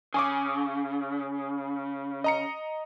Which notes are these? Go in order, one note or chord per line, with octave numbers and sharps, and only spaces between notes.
C#3 G#5 C#6 D6
D#5 A#5 C#7